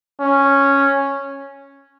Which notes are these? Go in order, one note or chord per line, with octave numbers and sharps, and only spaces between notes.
C#4